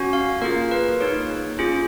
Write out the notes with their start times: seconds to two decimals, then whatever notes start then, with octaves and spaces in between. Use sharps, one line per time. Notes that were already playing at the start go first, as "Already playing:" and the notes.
Already playing: C#4 F#4
0.13 F5
0.41 A#3 F4 G#4 A#4
0.71 B4
1.00 A#3 D#4 G#4 C#5
1.59 C#4 F4 G#4